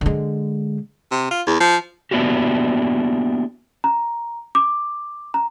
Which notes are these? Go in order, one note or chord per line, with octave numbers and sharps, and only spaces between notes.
D3 G#3
C3
F4
E2
F3
A#3 B3 D4 E4 F#4 G4
A#5
D6
A#5